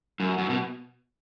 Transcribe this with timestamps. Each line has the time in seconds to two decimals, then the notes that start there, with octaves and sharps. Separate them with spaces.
0.20 F#2
0.38 F#2
0.50 B2